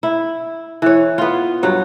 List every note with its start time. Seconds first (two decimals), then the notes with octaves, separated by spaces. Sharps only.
0.03 E4
0.82 E3 C#5
1.18 B3 F4
1.63 G2 F#3 C#5